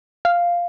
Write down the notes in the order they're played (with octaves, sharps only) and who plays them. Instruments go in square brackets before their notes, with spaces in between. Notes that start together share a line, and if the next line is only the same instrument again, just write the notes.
[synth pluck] F5